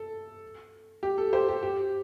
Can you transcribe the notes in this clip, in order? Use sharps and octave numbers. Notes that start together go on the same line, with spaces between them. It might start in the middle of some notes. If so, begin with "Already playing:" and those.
Already playing: A4
G4
A4
G4 C5
G4
G4